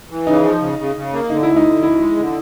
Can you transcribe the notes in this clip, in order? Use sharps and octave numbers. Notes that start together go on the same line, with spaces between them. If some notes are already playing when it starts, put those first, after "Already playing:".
E3
C#3 D#4
F3
C#3
C#3
C#3
A#3
D3 D#4
D2 E4
D#4
D3
D2 E4
G#3
D3